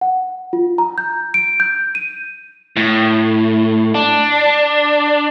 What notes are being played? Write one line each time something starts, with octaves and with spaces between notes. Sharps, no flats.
F#5
F4
A#5
G6
D7
G6
D#7
A2
D4